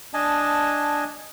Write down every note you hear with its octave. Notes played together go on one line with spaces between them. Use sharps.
D4 D#5 G#5 A5